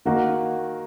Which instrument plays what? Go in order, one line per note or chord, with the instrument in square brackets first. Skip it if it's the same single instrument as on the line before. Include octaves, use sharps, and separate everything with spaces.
[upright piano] D#3 A#3 D#4 F#4